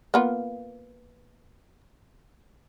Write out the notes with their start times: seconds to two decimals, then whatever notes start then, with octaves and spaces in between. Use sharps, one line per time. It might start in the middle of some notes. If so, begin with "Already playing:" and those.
0.14 A#3 B3 F4